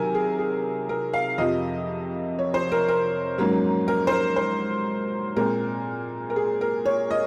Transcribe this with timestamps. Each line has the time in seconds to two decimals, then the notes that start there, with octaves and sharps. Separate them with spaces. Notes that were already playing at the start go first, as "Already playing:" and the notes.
Already playing: C3 D#3 F#3 A#4 G#5
0.15 G#4
0.39 G#4
0.89 A#4
1.14 F5
1.38 F2 C3 F3 D#5
2.39 C#5
2.54 C5
2.72 A#4
2.88 A#4
3.38 G#2 F#3 A#3 C#4
3.88 A#4
4.07 C5
4.11 A#4
4.36 C5
5.36 A#2 G#3 C4 A#4
6.30 A#4
6.36 G#4
6.61 A#4
6.86 C#5
7.11 D#5